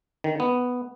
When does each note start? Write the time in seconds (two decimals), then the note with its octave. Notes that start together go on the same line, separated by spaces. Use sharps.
0.24 D#3
0.40 B3